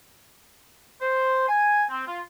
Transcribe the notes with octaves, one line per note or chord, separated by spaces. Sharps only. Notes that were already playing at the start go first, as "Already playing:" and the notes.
C5
G#5
C4
F4